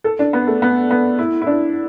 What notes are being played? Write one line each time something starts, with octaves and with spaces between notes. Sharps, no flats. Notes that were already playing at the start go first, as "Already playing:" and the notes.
A4
D4
B3
A3
B3
B3
E4
E4
D4